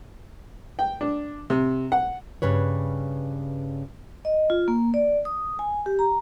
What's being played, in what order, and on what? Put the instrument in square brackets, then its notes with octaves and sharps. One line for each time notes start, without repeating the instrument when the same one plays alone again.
[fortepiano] G5
D4
C3
F#5
[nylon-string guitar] G2 C#3 B4 C#5
[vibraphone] D#5
F4
A#3
D5
D#6
G#5
G4
A#5